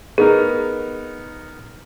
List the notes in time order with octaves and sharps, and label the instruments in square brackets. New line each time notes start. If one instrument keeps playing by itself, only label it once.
[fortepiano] B3 D#4 A#4 [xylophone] G#4